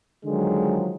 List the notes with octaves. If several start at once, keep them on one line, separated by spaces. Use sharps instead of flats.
D3 D#3 F3 F#3 G#3